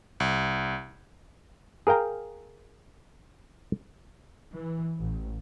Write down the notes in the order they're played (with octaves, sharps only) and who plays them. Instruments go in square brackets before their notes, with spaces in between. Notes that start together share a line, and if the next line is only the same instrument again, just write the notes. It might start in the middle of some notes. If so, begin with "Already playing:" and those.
[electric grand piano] C2
[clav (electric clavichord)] G#4 A#4 F5 G5 A#5
[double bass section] E3
A1